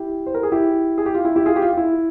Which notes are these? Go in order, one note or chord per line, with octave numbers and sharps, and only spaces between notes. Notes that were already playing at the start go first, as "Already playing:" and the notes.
Already playing: E4 G4
C5
A#4
G#4
E4 G4
G#4
G4
F4
E4
E4 G4
F4 G#4
G4
F4
F4
E4